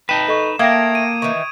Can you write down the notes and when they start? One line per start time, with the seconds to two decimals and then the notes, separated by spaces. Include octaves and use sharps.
0.09 D#4 B4 G5 A5 E7
0.28 A4 D#5 C#6
0.59 A3 A#3 F5 G5 D#6 G#6 A#6 D7
0.95 D#7
1.22 D#3 E3 C#6